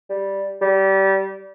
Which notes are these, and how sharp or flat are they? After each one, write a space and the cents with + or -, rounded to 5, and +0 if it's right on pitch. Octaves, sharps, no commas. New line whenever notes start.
G3 -5
G3 -25